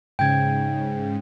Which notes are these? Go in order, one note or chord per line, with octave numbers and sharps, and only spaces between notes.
G#2 C#3 G5 G#6